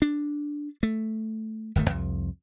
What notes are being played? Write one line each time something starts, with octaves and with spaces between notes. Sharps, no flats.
D4
A3
D1 G1 D#3 A3
C2 F2